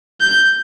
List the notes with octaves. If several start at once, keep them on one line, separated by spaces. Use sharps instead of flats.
G6